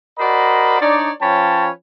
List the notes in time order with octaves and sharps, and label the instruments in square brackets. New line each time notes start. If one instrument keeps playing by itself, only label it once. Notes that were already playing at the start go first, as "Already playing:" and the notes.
[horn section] F#4 A#4 C5 D5 D#5 B5
D4 D#4 C#5 D5
F3 C#4 B4 C#5 G5 A5